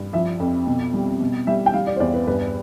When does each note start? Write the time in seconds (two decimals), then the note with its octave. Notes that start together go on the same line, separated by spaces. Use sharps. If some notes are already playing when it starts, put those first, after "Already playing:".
Already playing: G2
0.13 F3 E5
0.40 F2
0.67 B2
0.94 G3
1.20 B2
1.47 G3 E5
1.66 G5
1.74 G3 F5
1.87 D5
1.96 C5
2.00 E2 D5
2.14 B4
2.27 G2 B4